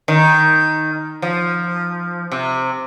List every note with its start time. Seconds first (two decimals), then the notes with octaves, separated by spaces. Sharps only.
0.08 D#3
1.22 F3
2.32 C3